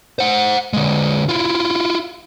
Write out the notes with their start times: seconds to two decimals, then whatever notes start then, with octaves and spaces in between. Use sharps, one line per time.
0.19 C5 F#5
0.73 D3 G#3
1.29 E4 F4